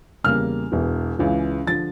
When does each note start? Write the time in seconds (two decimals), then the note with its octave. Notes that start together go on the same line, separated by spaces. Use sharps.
0.24 E2 C#3 G3 A#3 F6
0.72 E1 E2 E3
1.19 C#2 C#3 E3
1.67 D3 F3 A6